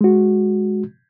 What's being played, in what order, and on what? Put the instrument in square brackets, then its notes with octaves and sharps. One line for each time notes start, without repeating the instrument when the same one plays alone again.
[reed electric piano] G#3 F#4